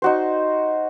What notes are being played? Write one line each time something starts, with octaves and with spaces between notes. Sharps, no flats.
D#4 F#4 C5